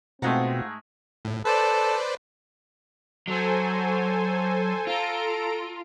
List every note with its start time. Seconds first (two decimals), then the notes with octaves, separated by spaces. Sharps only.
0.22 G#2 B2 G#3 A3 C4 F4 F5 F#5
1.25 A2
1.45 A4 B4 C5 D5
3.28 F#3 A4 C5 G#5
4.87 F4 A4 A#5 D7